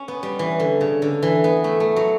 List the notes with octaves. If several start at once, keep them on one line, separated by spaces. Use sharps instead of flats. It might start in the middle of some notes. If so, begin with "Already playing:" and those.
Already playing: C#4
B3
G3
E3
D3
C#3
D3
E3
B3
A3
A3
F#3